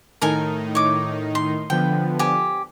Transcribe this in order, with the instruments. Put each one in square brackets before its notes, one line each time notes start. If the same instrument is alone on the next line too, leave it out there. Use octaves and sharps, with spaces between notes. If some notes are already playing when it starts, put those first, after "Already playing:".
[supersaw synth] A2 D#3 D#4 [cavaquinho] A4 A#4 G#5
[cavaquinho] C#5 D6
C6
[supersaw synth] D3 F3 B3 [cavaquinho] G5
[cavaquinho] G4 G#5